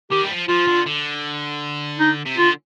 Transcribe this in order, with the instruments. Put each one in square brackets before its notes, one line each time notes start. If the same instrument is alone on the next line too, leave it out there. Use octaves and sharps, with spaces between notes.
[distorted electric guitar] D#3 [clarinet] G4
[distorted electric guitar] G3
F3
[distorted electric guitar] F3 [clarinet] F4
[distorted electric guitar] D3
D3
[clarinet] D#4
[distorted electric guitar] C3
[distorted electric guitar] D3 [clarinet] F4